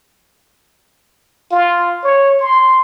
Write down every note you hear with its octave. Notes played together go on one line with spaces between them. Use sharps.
F4
C#5
C6